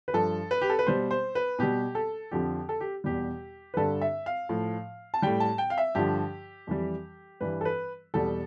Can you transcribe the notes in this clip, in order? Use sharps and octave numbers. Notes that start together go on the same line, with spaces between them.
B4
G2 F3 A4
B4
G4
A4
B4
B2 G3 C5
C5
B4
B2 G3 G4
A4
F2 D3 F3 G4
A4
G4
E2 B2 G3 G4
B4
G2 D3 G3 A4
E5
F5
A2 F3
A5
A2 G3 G5
A5
G5
F5
E5
G2 D3 F3 G4
F2 E3 G3
G2 E3 G3 B4
A4
B4
E2 B2 G3 A4